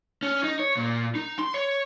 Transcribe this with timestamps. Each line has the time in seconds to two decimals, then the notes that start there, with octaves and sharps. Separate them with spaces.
0.23 C#4
0.43 D#4
0.59 C#5
0.77 A#2
1.15 D#4
1.39 C6
1.54 C#5